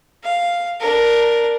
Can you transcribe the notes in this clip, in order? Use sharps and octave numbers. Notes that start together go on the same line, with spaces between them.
F5
D4 A#4